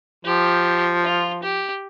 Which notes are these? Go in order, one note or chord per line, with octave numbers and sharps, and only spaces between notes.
F3 G4
F4
G4